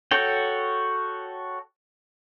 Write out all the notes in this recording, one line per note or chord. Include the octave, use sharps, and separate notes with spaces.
F#4 A4 C#5 G5